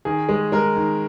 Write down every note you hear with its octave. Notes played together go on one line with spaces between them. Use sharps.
D#3 G#4
G#3
G#3 A#4
D#3